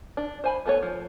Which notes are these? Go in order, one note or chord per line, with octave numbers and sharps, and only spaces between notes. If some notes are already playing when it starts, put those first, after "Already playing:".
D4
C5 G#5 B5
A3 B3 A4 A#4 C#5
F3